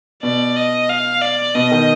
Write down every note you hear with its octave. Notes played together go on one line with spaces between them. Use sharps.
B2 D5
D#5
F5
D5
B2 D#5
D#3